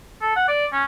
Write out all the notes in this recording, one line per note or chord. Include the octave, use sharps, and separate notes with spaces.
A4
F#5
D5
C#4